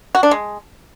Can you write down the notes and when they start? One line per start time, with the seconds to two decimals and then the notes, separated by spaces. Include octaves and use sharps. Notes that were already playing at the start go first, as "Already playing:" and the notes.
0.15 F#4
0.23 D4
0.31 G#3